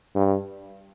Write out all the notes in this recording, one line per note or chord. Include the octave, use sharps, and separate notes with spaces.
G2